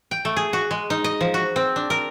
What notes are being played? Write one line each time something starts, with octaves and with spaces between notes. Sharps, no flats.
G5
A3
G#4
F#4
G#3
D#4
D#5
F3
F#4
C4
D4
A#4